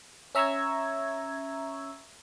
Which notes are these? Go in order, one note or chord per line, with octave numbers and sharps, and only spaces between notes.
C#4 E5 A#5 C#6 E6 G#6